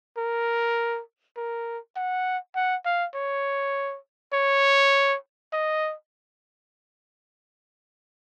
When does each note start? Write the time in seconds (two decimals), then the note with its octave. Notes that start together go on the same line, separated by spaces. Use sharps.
0.17 A#4
1.37 A#4
1.96 F#5
2.55 F#5
2.85 F5
3.15 C#5
4.33 C#5
5.53 D#5